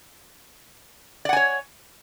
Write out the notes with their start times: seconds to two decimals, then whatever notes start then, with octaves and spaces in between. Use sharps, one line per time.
1.25 D5
1.29 F#5
1.33 G#5
1.37 C#5